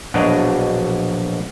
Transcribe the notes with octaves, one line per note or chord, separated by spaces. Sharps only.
A#1 B2 F#3 D4 D5 D#5